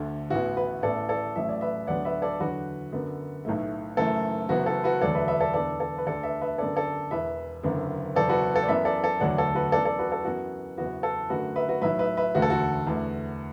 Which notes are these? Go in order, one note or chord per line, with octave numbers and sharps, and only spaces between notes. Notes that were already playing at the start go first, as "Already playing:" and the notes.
Already playing: D2 D3 A3
A1 A2 E3 B3 F#4
F#4 B4
A1 A2 E3 B3 A4 D5
A4 D5
A1 A2 F#3 A3 E5
D5
B4 E5
D2 D3 F#3 B3 D5 F#5
B4 E5
A4 D5
E2 D3 F#3 F#4 B4
F#2 D3 B3
B1 A2 A3
F#1 F#2 E3 A3 A4
F#1 F#2 E3 B3 F#4
A4
F#4 B4
E1 D2 D3 F#3 A4 D5
B4 E5
B4 E5
A4 D5
E1 E2 D3 B3 A4 D5
A4
B4
D2 D3 A3 A4 D5
B4 E5
B4 E5
F#2 D3 B3 A4 D5
A4 D5
E1 E2 E3 B4 E5
F#1 F#2 D3 B3
F#1 E2 B2 B3 A4 D5
F#4 B4
A4
D5
F#2 E3 B3 B4 E5
A4 D5
A4
E1 D2 D3 F#3 A3 D5 F#5
A4
F#4 B4
F#2 E3 B3 A4 D5
A4 D5
F#4 B4
A4
F#2 E3 B3 F#4
F#1 E2 E3 B3 F#4
A4
F#2 D3 A3 F#4 B4
B4 E5
F#4 B4
B1 A2 F#3 B4 E5
B4 E5
B4 E5
E1 D2 D3 A3 F#4
A4
F#4
E2 D3 A3